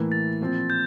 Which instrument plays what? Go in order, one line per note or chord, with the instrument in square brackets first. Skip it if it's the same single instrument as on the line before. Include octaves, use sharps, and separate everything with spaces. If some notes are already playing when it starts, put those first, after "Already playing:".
Already playing: [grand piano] A2 E3 A#3 E4
[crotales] A6
[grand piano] A#2 F3 C4
[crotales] G6